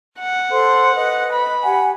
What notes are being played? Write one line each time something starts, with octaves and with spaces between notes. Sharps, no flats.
F#5
A4 C5 C6
B4 D#5
B5
G4 F#5 G#5